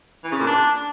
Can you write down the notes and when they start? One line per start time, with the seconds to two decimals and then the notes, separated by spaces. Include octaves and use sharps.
0.24 E3
0.32 C#3
0.39 A#2
0.47 D4